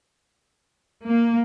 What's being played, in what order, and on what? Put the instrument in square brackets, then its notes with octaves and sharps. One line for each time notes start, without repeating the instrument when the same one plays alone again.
[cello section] A#3